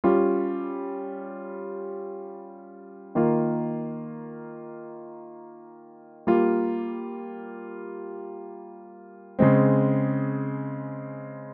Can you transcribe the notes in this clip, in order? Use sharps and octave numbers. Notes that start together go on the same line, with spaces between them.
G3 C#4 F4
D#3 A#3 F4
G3 A#3 F4
C#3 G#3 C4